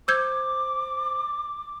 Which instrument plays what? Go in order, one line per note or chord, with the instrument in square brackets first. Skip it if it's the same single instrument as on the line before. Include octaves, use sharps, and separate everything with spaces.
[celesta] C5 [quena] D6 [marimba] E6 G6 G#6